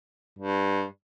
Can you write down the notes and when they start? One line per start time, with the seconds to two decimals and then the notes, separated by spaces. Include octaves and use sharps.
0.39 G2